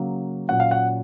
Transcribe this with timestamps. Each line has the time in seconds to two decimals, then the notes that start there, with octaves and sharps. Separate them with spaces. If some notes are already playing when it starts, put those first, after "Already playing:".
Already playing: C#3 F#3 A#3
0.48 A#2 F#3 C#4 F#5
0.60 F5
0.71 F#5